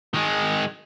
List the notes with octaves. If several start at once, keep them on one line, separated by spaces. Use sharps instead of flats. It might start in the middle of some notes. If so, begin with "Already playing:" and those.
D#3 G#3